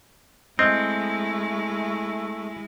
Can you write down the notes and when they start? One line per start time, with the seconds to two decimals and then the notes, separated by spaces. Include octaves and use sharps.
0.59 G#3 A3 C4 E4 D#5 F6 G6